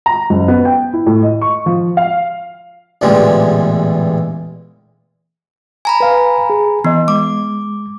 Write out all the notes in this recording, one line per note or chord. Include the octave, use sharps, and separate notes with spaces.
A#5
F#1
B3
G5
E4
A2
D#5
C#6
F3
F5
A1 E2 A#2 D3 G3 G#3
G#5 A#5 B5
B4 F5
G#4
E3 B3 D#5
G#3 D6